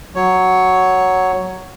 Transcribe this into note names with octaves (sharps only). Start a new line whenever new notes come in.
F#3 C#5